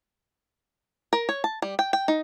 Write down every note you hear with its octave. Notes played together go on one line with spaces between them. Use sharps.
A#4
C#5
A5
G3
G5
G5
D#4